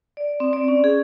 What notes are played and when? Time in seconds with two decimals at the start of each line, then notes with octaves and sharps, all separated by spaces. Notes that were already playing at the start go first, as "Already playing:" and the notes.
0.17 D5
0.40 C4
0.53 D5
0.68 C#4
0.84 G#4